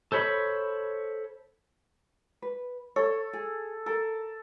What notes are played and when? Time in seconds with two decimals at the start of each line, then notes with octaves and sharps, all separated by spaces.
0.12 A4 C5 C#5 B5
2.42 B4
2.96 A4 C#5
3.33 G#4
3.86 A4 A#4